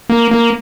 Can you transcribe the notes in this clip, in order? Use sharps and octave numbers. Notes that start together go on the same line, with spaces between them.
A#3
A#3